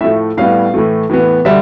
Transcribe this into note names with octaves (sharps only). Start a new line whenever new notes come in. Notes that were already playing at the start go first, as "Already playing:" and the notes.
A2 F3 A3 E5
A2 G3 B3 F5
A2 E3 A3
A2 E3 B3
D3 G3 E5